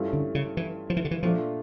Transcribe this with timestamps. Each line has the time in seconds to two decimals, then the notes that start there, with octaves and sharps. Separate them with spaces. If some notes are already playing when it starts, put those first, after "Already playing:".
Already playing: G2 E3 A3 C#4 F4
0.13 D3
0.35 C#3
0.57 E3
0.90 F3
0.97 E3
1.05 D3
1.11 E3
1.22 A#2 F3 A3 D4 F4